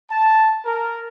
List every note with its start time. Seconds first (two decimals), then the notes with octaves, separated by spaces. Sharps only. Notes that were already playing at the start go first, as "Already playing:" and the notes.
0.11 A5
0.65 A#4